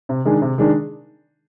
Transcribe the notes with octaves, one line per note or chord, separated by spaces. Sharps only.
C3
D#3 G#3 D4 G#4
C3
D#3 G#3 D4 G#4